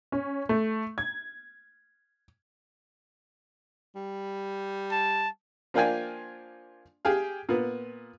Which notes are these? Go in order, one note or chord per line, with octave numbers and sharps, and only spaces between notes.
C#4
A3
G#6
G3
A5
F3 A#3 D4 F4 G5 G#5
G4 G#4 F5
A#2 B3